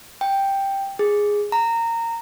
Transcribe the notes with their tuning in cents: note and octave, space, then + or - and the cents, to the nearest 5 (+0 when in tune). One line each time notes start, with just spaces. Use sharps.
G5 +5
G#4 -5
A#5 -20